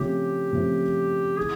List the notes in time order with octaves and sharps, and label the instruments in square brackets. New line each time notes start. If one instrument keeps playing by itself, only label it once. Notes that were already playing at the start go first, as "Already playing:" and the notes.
Already playing: [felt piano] C#3 F3 A3 C4 [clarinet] G4
[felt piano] C#3 F3 A3 C4
[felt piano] E3 [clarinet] G#4